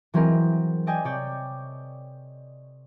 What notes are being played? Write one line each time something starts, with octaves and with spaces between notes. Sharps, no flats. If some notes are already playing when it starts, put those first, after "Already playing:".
E3 F#3 C4 G#4 A#4 D#5
D5 D#5 G5 G#5
C3 C#5 D5 G5